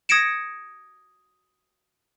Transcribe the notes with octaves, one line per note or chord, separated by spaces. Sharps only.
D#6 G#6 A#6 C#7 D7 E7